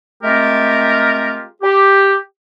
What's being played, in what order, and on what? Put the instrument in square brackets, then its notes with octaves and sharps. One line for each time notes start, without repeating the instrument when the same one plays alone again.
[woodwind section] G#3 A3 C4 F4 G4 A#4
G4